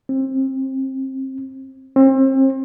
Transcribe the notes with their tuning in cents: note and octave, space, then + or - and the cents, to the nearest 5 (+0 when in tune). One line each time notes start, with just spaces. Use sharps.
C4 +25
C4 +35